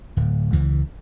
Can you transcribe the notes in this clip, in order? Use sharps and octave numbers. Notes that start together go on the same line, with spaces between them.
D1
C#2 E3